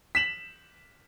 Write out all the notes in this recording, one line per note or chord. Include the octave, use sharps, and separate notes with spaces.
B6 E7 F#7